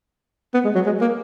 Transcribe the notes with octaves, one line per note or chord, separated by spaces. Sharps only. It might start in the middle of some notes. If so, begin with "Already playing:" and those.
B3
G#3
F#3
G#3
A#3